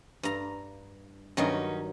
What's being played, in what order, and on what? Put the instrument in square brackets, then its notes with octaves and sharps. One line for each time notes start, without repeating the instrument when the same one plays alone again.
[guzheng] G2 A#5
[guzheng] G2 D#3 F#3 [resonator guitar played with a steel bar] C#4 D#4